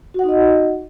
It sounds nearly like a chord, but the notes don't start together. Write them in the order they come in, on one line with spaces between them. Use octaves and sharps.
F#4 F#5 D#4 D#5